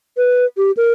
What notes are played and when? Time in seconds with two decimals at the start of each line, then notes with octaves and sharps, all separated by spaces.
0.17 B4
0.57 G4
0.77 A#4